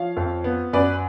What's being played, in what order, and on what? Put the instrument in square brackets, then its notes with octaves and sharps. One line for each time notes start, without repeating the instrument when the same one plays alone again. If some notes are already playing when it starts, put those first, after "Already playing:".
Already playing: [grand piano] F3 C#5 F5
F2
B3
F#2 B4 D5